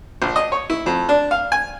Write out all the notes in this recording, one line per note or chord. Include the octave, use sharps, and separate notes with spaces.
A#1
D#5
C#5
E4
F2
D4
F5
G#5